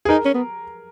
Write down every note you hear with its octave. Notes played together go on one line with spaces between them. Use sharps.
G#4
D#4 A#4
C#4
B3